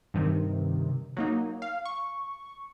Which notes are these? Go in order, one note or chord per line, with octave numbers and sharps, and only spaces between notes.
G2 C3 D#3
F#3 A#3 D#4
F5
C#6